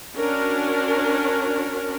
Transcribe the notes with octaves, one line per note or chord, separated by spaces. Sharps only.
C#4 D4 F#4 A#4